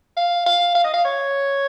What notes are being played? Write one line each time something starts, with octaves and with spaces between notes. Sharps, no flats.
F5
F5
F5
D#5
F5
C#5